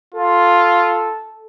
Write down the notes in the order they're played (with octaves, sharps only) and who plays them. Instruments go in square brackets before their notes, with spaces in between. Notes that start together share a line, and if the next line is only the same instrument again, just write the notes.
[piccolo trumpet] F4 [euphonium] A4